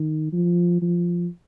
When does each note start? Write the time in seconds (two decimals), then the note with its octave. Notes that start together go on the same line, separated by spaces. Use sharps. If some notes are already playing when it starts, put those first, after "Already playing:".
Already playing: D#3
0.33 F3
0.82 F3